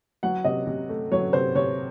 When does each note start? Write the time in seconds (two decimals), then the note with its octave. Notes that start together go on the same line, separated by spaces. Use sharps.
0.23 F#3 F#5
0.44 C3 D#5
0.67 C3
0.89 A3
1.12 F#3 C#5
1.33 C3 C5
1.55 C3 C#5